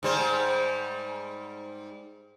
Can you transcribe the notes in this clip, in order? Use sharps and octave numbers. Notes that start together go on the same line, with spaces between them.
G#2 G3 C5